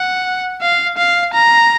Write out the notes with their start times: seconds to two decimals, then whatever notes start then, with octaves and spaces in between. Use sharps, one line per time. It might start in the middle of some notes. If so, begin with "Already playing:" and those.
Already playing: F#5
0.62 F5
0.98 F5
1.34 A#5